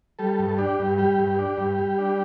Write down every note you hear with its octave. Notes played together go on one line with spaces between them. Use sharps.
G3 A4
G2
D4 G4
G2
G3 G4
G2
D4
G2
G3
D4